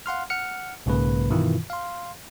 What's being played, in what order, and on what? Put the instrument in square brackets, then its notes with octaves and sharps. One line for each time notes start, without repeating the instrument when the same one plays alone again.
[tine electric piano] F5 F#5 C6 F6
F#5 F6 C#7
B1 G#2 C#3 A#3 B4
G2 B2 D#3 E3 E4 F4
F5 C6